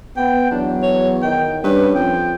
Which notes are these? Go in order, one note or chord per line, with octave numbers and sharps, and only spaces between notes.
B3 G5
E2 F#3 D4
C#5
D#3 G5
G2 C#4 B4
F2 G5